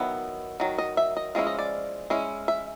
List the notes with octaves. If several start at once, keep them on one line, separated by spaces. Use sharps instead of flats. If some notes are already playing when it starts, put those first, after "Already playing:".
Already playing: D#3 F#3 B3 E4
D#3 F#3
D#5
E5
D#5
F3 G#3 C#4 E4
D#5
D5
G#3 C#4 E4
E5